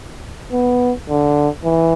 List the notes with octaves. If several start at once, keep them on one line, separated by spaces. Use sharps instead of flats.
B3
D3
E3